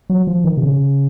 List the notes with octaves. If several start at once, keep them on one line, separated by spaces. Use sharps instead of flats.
F#3
F3
D#3
C3
C#3